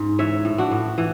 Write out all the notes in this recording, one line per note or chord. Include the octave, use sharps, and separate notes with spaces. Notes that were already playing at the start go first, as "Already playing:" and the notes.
Already playing: G#2
E3 C#5 E5
A2
D4 F#4
A2
E3